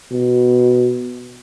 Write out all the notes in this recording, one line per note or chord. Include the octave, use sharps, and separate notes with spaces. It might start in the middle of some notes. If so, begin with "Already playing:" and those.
B2